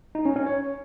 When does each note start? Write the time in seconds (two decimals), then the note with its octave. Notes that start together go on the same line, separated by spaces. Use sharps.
0.15 D#4
0.25 C#4
0.36 C#4
0.46 C#5